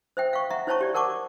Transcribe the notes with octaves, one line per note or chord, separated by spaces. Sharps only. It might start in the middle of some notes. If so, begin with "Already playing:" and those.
C5 E5 G5
F5 C#6
E5 F#5 A#5
E4 C5 C#5 A5 A#5 C#6
G4 D5
A#4 F#5 A5 C#6 D6